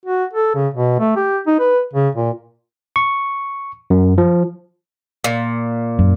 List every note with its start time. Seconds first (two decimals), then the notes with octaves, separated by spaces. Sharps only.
0.06 F#4
0.33 A4
0.55 C#3
0.74 B2
1.00 A3
1.16 G4
1.47 D#4
1.59 B4
1.94 C#3
2.15 A#2
2.96 C#6
3.90 F#2
4.18 F3
5.24 A#2
5.99 F#2